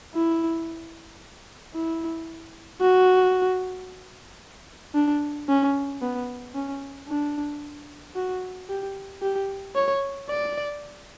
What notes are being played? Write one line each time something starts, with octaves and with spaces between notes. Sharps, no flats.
E4
E4
F#4
D4
C#4
B3
C#4
D4
F#4
G4
G4
C#5
D5